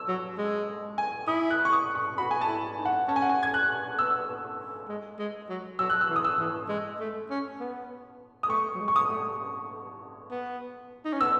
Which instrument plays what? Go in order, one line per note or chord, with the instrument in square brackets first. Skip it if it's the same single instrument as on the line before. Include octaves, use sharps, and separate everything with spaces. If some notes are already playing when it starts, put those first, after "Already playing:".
Already playing: [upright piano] E6
[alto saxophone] F#3
G#3
[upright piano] G#5
[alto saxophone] E4 [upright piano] D#6
[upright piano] F#6
C#6
D#6
C#6
[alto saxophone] F#4 [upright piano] B5
[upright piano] G#5
A5
[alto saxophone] E4
D#4
[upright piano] F#5
[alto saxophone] C#4 [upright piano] A5
[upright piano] G#5
F#5
G#5
G#6
F#6
[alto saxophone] B3 [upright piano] E6
[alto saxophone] G#3
G#3
F#3
[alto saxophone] F#3 [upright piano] E6
[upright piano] F#6
E6
[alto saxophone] E3
[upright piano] D#6
E6
[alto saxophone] E3
G#3
A3
C#4
B3
[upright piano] D#6
[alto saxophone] A3 [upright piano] C#6
[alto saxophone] F#3
G#3
[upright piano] C#6
D#6
[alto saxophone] A3
B3
D#4
C#4
[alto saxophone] B3 [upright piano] E6